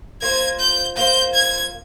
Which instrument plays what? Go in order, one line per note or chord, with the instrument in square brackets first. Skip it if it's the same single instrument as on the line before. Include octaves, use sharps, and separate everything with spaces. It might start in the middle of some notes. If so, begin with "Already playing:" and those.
[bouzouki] A#3 F4 C5 [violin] G#6
[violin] G6
[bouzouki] A#3 F4 C5 [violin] G6
[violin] G#6